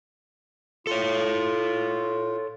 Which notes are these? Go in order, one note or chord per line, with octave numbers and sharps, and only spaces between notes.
F4 A4 C#5